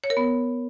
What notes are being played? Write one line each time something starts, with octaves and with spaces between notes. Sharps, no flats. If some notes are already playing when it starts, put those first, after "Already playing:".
C#5
A#4
B3